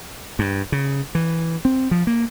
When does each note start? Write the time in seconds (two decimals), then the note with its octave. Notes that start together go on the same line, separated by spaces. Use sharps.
0.39 G2
0.72 C#3
1.15 E3
1.65 C4
1.91 F3
2.07 A#3